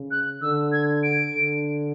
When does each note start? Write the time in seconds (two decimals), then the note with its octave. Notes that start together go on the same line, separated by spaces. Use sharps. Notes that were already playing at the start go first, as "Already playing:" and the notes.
Already playing: C#3
0.11 F#6
0.42 D3 E6
0.72 G#6
1.03 D7
1.34 D3